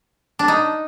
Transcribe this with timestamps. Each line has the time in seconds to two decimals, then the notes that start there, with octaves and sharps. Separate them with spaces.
0.39 D4
0.48 D#4